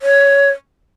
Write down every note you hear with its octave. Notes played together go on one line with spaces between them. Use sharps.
C#5